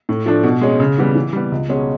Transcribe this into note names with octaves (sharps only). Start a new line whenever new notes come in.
A2
F3 A3 D4
B2
G#3 C#4
C#3
E3 G3 B3
E3
G3 B3
C#2
B2 G#3 C#4